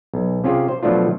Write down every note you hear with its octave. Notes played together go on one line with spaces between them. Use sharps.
B1
C3 C#4 F4 G4 G#4
C5
B2 F3 F#3 A3 D4 F4